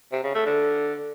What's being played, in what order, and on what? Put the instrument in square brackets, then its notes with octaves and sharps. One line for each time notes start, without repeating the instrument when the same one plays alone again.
[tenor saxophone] C3
C#3
A3
D3